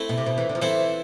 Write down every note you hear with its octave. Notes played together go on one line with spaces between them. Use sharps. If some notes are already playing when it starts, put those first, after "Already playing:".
Already playing: A3 C4 E4
B2
C3
B2
E3
D3
F3
E3 C4 E4 A4 C5